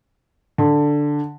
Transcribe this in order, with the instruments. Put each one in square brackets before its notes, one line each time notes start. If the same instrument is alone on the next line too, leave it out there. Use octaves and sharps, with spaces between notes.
[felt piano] D3